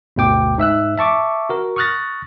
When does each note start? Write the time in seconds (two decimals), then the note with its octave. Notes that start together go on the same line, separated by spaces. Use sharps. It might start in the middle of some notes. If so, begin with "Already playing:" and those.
0.16 G1 D2 B2 G5 D6
0.58 G#2 E5 E6 F#6
0.98 E5 A5 C#6 D6
1.50 F#4 A#4
1.76 C#6 D#6 F6 F#6 A6 A#6